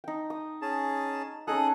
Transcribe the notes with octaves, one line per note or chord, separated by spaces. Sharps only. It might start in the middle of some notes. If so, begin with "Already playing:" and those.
D#4 G5
D#6
C#4 G#4 A5
C#4 D#4 G#4 A4 D#6 F#6